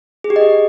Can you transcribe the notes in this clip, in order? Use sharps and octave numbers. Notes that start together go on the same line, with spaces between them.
G#4
G4
D#5